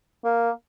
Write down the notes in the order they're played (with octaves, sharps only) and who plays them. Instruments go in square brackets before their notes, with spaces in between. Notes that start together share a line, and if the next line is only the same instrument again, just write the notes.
[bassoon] A#3